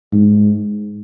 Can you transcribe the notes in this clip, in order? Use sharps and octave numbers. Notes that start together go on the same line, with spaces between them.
G#2